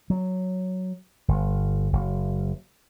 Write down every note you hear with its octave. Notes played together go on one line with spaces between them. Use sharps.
F#3
G1
F#1